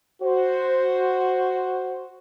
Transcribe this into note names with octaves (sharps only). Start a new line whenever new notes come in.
F#4 C5